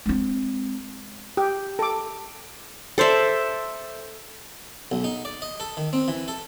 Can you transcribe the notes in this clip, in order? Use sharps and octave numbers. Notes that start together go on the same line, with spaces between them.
G#3 C4
G4
A4 D6
A4 C5 D5 E5
B1
D#4
D5
D#5
A4
D#3
C4
E3
A4